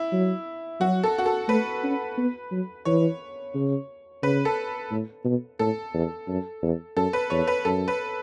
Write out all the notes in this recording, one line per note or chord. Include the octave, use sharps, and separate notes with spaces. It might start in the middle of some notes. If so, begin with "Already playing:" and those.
Already playing: E4
F#3
F#3 F#4
A4
F#4
A4
A3 B4
C#4
B3
F#3
E3 C#5
C#3
C#3 B4
A4
A2
B2
A2 A4
E2
F#2
E2
F#2 A4
B4
E2 C#5
B4
F#2 A4
B4